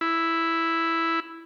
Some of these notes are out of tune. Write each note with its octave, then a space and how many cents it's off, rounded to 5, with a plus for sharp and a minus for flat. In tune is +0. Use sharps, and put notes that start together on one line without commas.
E4 +0